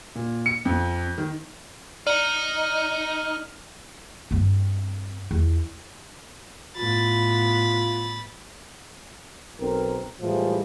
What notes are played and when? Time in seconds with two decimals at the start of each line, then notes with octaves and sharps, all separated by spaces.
0.15 A#2
0.46 C#7
0.65 F2
1.18 D#3
2.07 D#4 D5 F6 C#7 D#7 F#7
4.31 G2 C4
5.31 E2 F3
6.77 A2 B3 F4 B5 A6
9.59 B1 C4 A#4
10.21 A2 E3 F3 G3 G#3